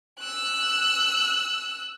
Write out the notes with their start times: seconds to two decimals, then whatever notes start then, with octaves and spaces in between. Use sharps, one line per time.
0.20 E6 F#6